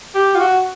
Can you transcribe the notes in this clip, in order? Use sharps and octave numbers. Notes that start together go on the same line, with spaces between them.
G4
F4
F#4